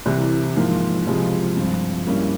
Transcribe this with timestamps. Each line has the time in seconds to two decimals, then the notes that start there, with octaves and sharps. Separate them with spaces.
0.06 C2 C3 E3
0.56 G#2 F3 A#3 F4
1.07 C#2 C3 F3 G#3
1.57 G2 F3 C4
2.07 G2 G3 A#3 C#4 E4